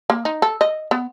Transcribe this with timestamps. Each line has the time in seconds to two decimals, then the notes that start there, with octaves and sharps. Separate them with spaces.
0.10 A#3
0.25 D#4
0.42 A4
0.61 D#5
0.91 B3